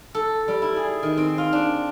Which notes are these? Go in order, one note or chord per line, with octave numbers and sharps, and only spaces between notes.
A4
G3
E4
G#4
D#3
C4
F4
D4